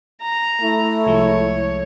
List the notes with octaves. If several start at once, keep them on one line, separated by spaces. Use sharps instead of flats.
A#5
A3 E4
C2 F3 G#3 C#5